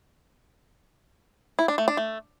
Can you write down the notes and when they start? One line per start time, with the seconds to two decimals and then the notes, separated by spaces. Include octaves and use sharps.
1.59 E4
1.68 D4
1.78 A3
1.88 D4
1.97 A3